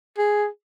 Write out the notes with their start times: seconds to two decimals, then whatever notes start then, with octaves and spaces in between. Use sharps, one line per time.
0.18 G#4